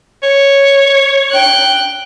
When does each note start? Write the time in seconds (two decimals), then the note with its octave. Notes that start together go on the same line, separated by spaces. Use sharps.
0.23 C#5
1.31 G5 F#6